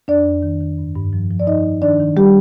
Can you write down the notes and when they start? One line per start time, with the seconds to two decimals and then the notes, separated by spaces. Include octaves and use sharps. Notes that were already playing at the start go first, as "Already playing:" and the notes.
0.08 F2 D4 D5
0.25 F2
0.43 D#3
0.60 D#3
0.78 G2
0.95 G2
1.13 F3
1.30 F3
1.40 D5
1.47 G2 D#4 D#5
1.65 G2
1.82 D#3 D4 D5
2.00 D#3
2.17 G3 G4